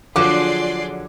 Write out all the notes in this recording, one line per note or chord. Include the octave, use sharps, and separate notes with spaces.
D3 F3 F#3 F4 G#4 D5 C6 D6